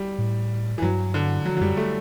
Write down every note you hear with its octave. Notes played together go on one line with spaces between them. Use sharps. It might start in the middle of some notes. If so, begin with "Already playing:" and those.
Already playing: G3
A2
E3
G2 F#3
D3
F#3
F#3
F#2 G3
A3